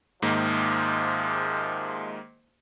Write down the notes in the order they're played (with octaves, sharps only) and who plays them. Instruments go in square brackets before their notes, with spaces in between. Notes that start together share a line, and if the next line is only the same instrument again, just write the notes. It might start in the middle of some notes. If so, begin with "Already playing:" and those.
[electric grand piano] G#2 D#3 A#3 [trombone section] C3 F3 G#3